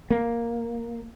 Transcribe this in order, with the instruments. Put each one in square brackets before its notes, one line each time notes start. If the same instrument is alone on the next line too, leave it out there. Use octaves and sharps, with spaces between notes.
[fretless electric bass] A#3